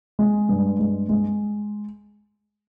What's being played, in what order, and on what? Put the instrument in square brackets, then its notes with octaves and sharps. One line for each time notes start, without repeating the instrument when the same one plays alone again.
[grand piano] G#3
G2
G#3
G#3